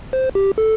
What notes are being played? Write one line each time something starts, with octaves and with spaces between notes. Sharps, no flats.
C5
G4
A4